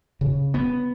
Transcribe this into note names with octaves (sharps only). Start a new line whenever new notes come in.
C#3
B3